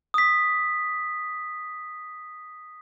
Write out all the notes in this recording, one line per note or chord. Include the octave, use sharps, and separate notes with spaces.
D#6 B6